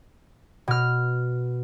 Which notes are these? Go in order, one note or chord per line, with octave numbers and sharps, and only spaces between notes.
B2 F6